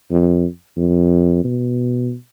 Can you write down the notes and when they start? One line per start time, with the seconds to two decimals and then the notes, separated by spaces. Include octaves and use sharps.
0.11 F2
0.77 F2
1.44 B2